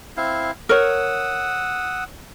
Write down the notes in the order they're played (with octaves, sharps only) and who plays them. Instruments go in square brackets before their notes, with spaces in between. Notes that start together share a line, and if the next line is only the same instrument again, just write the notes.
[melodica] C4 E4 F5
[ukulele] A#4 C#5 [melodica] F#5 D#6 E6